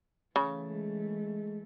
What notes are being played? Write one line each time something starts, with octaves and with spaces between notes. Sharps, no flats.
C#3 E3 A3
G#3